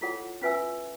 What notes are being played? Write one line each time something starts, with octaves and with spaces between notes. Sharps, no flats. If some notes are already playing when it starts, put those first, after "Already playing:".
E4 F4 G#4 A4 C#5 F#5
C#4 F4 B4 E5 G#5 E6